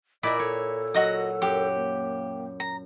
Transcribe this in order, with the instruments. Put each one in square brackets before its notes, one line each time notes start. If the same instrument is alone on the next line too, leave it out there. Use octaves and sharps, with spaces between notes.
[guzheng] A#2 E4 D5 [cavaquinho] A#4 B5 [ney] D#5
[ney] A4 [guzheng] C#5
[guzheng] F#3 [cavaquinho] F#4 D#5 D#6
[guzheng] F#2 [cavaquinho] G4
[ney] A#3
[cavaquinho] A#5